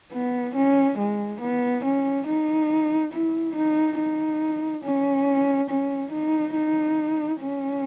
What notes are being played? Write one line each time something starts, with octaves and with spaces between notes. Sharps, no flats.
B3
C#4
G#3
B3
C#4
D#4
E4
D#4
D#4
C#4
C#4
D#4
D#4
C#4